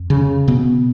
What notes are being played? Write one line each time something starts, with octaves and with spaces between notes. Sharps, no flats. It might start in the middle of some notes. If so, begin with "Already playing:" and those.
Already playing: F2
C#3
B2 B3